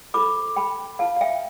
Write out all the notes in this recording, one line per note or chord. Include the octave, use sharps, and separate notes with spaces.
F4 A4 C5 B5 D6
G5 B5
F4 B4 F5 A5
F5
E5 G5